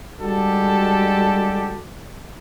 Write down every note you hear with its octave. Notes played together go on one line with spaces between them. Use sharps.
G3 G#3 D4 F#4 G4 A4